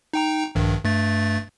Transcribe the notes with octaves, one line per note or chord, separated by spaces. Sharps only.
D#4 G5 A#5
A#1 G2 D#3
G2 A3 A6